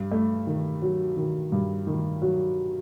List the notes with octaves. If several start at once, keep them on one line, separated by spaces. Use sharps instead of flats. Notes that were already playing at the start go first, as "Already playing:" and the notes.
Already playing: G2
A3
D#3
F#3
D#3
G2
D#3
F#3